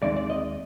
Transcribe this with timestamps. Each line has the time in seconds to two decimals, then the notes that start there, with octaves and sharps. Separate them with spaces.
0.02 D#2 D#3 G#3 C4 D5
0.16 D5
0.30 D#5